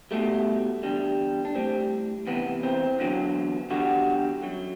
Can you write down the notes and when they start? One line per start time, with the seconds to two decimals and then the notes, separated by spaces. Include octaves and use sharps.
0.11 B2 G3 A3
0.83 E2 D3 G3
1.45 D4
1.55 A2 G3 C4
2.27 E2 C3 E3 B3
2.63 C4
2.99 E2 D3 F#3
3.70 E2 D3 G3 F#4
4.43 F#2 F#3